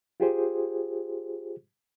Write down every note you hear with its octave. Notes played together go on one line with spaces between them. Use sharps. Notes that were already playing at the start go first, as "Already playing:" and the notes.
F4 G4 G#4 C5